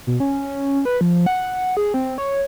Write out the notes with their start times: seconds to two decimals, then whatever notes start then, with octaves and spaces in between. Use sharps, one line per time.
0.07 B2
0.20 C#4
0.85 B4
1.01 F3
1.26 F#5
1.77 G#4
1.94 C4
2.18 C#5